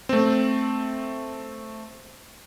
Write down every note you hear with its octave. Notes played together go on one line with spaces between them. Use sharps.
A3 C4